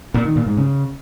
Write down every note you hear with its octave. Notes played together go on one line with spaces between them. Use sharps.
A#2
D#3
A#2
G#2
C#3